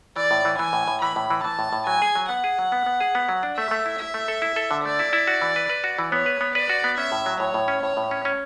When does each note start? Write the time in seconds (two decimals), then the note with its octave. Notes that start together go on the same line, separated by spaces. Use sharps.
0.16 E3 D5
0.31 A2
0.45 E3
0.59 E3 G#5
0.73 A2
0.88 A2
1.02 E3 B5
1.16 A2
1.30 E3
1.44 E3 A5
1.59 A2
1.73 A2
1.87 F#3 G#5
2.02 G#4
2.15 F#3
2.29 B3 F#5
2.44 G#4
2.58 F#3
2.72 B3
2.86 B3
3.00 G#4
3.15 B3
3.29 F#3
3.43 D4
3.57 A3 E5
3.71 A3
3.86 E4
3.99 E4 E5
4.14 A3
4.28 A4
4.42 E4
4.56 A4
4.71 D3
4.84 A3 D5
4.99 E4
5.13 E4
5.27 F#4
5.42 E3
5.56 B4
5.70 B4
5.84 F#4
5.99 E3
6.12 B3 C#5
6.26 B4
6.41 B3
6.55 B4 D5
6.69 F#4
6.84 B3
6.98 C#4 E5
7.12 A2
7.26 F#3
7.40 A2 C#5
7.54 A2
7.68 C#4
7.83 A2 C#5
7.97 A2
8.11 C#4
8.25 C#4